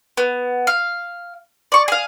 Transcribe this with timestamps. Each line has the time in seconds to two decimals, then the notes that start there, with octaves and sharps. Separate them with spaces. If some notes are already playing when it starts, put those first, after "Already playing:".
0.17 B3
0.67 F5
1.72 D5 C#6
1.88 G#4 F5